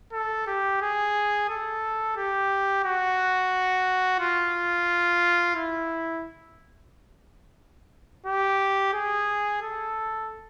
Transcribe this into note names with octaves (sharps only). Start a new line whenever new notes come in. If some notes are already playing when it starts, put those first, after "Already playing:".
A4
G4
G#4
A4
G4
F#4
F4
E4
G4
G#4
A4